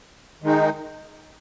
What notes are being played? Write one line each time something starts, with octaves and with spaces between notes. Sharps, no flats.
D#3 G#3 D#4